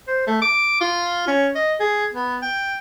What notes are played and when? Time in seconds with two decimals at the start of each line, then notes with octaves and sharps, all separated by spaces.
0.08 C5
0.27 A3
0.42 D6
0.81 F4
1.27 C#4
1.55 D#5
1.80 G#4
2.13 B3
2.42 G5